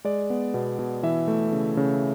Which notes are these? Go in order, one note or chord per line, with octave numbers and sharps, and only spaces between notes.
G#3 D5
B3
B2
B2
E3 E5
A3
C#3
C#3